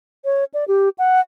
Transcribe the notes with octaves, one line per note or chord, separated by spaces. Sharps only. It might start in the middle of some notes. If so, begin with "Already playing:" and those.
C#5
D5
G4
F#5